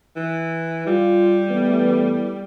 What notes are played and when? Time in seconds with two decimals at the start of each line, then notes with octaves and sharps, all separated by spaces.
0.16 E3
0.87 G3 F4
1.48 E3 A3 B3